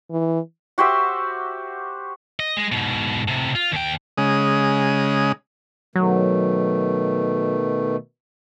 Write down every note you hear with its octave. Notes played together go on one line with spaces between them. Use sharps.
E3
F#4 G4 C5 E5
D#5
G#3
G#2 B2
A2 C3
F4
D#2 G5
C#3 G#3 D#6
B2 D#3 F#3 A3